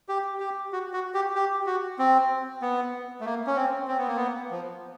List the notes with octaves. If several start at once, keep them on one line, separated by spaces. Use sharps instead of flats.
G4
G4
F#4
F#4
G4
G4
F#4
C4
B3
A3
A#3
C#4
C4
C4
B3
A#3
B3
F3